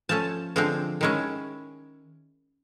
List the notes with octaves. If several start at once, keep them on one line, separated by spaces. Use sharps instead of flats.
F3 A3 C#4 A5
D3 F3 G#3 C4
D#3 G#3 C#4 E4